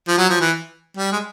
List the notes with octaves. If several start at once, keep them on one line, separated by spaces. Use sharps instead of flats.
F3
F#3
F3
E3
G3
G#3